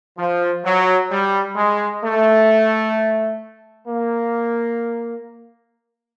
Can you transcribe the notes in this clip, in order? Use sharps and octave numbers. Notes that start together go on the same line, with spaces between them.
F3
F#3
G3
G#3
A3
A#3